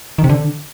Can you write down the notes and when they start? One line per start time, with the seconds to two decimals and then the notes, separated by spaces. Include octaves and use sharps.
0.18 D#3
0.24 C3
0.29 D3